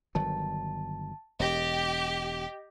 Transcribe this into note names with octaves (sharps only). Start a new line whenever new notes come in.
G1 D#3 F#3 A5
E1 G4 D#5 A#6